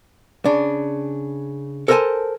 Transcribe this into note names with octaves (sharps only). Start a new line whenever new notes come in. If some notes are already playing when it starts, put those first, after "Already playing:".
C#3 D4
A4 A#4 C5 D5 G#5 A5